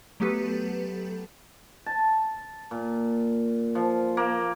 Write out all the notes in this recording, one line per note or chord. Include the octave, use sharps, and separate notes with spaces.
F#3 A3 B3 G4 A4 B4
A5
A#2
F3
A#3